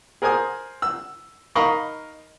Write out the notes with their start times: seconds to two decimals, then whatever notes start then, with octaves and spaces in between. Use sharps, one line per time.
0.22 G#4 A#4 C5 G#5 D#6
0.82 E6
1.55 D#4 A#4 D#5 F5 B5 C#6